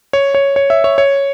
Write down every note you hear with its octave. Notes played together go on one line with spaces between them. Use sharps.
C#5
C#5
C#5
E5
C#5
C#5